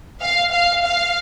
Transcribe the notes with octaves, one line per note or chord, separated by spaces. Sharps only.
F5
F5
F5